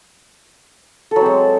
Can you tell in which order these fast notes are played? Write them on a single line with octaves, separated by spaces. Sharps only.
A4 F#3 C4 G#3